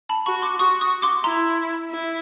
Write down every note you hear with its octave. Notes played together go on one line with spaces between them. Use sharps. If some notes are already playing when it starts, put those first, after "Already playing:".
A5 B5
F#4 B5 C#6
C6 D6
F#4 C#6 D#6
C#6 D#6
C6 D6
E4 A#5 C6
E4